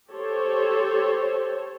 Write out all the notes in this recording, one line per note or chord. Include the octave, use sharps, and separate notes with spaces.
G4 A4 C5 C#5